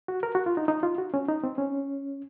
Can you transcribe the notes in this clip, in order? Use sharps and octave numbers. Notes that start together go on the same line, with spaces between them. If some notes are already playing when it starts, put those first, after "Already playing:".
F#4
A#4
F#4
F4
D#4
D#4
F4
F#4
C#4
D#4
C4
C#4